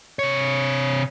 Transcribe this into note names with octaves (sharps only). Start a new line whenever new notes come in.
C3 C#5